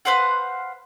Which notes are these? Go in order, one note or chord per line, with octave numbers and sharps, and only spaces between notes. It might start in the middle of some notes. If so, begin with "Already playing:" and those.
B4 C5 F5 F#5